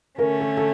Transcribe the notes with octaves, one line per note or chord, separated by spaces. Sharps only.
D3 A3 C#4 A#4
A4
A4